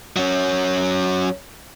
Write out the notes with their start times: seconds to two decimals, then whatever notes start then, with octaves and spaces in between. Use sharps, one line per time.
0.16 F#3 C#4